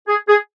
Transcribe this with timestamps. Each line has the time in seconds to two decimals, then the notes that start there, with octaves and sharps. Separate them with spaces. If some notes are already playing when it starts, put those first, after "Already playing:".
0.08 G#4
0.28 G#4